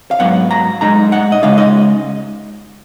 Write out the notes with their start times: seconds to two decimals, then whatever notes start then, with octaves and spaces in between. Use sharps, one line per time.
0.11 F5
0.19 G#2 F#3 B3 F#5
0.51 A#5
0.81 A#2 G#3 D#4 A#5
1.12 F#5
1.32 D#5
1.43 C#3 G#3 D#4 F5
1.58 D#5